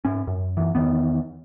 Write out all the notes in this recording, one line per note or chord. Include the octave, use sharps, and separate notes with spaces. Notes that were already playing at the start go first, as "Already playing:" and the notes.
G#2 C#4
F#2
F#2 E3
E2 D#3 B3